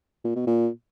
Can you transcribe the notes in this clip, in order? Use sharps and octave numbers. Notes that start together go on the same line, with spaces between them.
A#2
B2
A#2